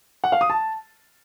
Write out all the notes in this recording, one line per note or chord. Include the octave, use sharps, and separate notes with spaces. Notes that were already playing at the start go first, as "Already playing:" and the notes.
F#5
F5
D#6
A5